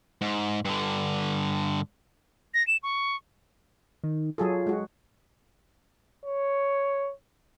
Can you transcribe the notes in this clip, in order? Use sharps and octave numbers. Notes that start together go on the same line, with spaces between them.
G#2
G2 D3
A#6
E7
C#6
D#3
F#3 F4 G#4 A4
G#3 F#4
C#5